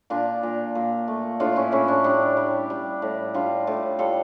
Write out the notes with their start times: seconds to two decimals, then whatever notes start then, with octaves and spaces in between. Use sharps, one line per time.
0.10 A#2 D4 F4
0.43 A#2
0.75 A#2
1.08 A3
1.40 A2 D4 F4
1.56 C#4 E4
1.72 A2 C#4 E4
1.88 D4
2.04 G3 D4
2.37 G3
2.70 G3
3.02 A2
3.34 G3 D4 F4
3.67 A2
3.99 G3 F4 A4